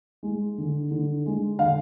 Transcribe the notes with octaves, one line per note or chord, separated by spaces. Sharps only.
G#3
D3
D3
G#3
D3 F5